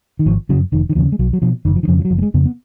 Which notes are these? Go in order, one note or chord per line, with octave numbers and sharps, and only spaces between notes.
D#3
G#1 F3
F#2 C#3 F#3
F1 D#3
D#3
D#2 C#3 F3
G#3
B1 F#3
F#3
B2 F3
F#1 D#3
F3
D#3
F2 C#3 F3
F3
F#3
F#1 F3
A#3
G#3
F2 C#3 B3
B3